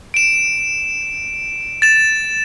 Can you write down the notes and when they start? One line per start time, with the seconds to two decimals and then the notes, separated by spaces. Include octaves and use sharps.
0.14 D7 E7
1.82 A6 E7